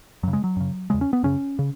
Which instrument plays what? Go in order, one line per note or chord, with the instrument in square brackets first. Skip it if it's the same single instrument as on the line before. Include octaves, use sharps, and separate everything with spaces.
[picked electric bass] F#2 C#3 F#3
G#3
F#3
F#2 C#3
E2 C#3 G#3
C#4
B3
F#2 C#3 C#4
C#3